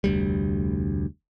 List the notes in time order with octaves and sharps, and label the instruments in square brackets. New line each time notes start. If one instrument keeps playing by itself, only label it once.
[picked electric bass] F1 D2 G3